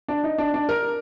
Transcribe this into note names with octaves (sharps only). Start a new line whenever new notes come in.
D4
D#4
D4
D4
A#4